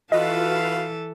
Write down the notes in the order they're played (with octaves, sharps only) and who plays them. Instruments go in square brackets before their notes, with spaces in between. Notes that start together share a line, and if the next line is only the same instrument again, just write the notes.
[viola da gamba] E3 A4 [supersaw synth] F4 F#4 B4 [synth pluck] D#5 [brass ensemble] F5